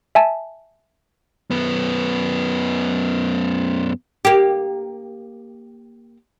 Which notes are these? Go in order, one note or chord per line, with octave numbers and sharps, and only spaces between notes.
E5 G#5 A5
F#2 B3
A#3 G4